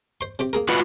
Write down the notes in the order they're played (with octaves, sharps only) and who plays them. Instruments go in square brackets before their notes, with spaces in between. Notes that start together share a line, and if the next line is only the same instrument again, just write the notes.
[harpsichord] C5 C6
C3 C4 G4
A#3 G#4 A#4
[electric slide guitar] F4 F#4 B4